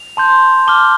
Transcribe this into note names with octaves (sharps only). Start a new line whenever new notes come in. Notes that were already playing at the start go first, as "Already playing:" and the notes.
Already playing: F7
A5 C6 G6
A5 D6 F6 G7